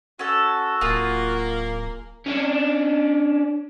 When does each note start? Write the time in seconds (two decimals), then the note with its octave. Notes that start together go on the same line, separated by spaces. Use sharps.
0.19 C#4 F#4 A4
0.81 D1 A#3 F4 G#4
2.26 C#4 D4